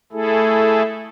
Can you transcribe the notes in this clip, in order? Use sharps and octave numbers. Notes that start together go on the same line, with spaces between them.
A3 E4 G#4 A4